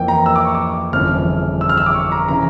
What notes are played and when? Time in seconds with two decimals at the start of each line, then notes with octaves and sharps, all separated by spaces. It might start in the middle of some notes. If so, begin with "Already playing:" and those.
Already playing: F2 E3 A#3 G5
0.08 A#5
0.26 E6
0.36 D6
0.45 C#6
0.55 D6
0.93 G1 F2 C#3 E3 F6
1.61 E6
1.69 F6
1.77 E6
1.86 D6
1.94 C#6
2.12 A#5
2.28 C#3 E3 A#5